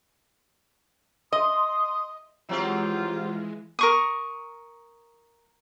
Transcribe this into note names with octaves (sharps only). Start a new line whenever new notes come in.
D#5 C6 D#6
E3 F#3 G#3 C4 F4 G4
A#4 C#6 D#6